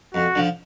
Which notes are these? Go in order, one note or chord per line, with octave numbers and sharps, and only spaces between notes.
F2 F#4
D3 F3